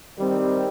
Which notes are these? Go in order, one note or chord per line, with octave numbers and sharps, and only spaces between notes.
D#3 G3 C4